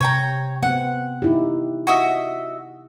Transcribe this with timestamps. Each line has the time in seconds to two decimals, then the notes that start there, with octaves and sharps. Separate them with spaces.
0.01 C3 C#5 G5 A#5
0.63 B3 C4 F#5
1.22 D#4 E4 G4
1.87 F#4 D#5 E5